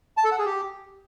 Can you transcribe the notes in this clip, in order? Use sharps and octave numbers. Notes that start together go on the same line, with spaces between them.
A5
A4
F#5
G#4
G4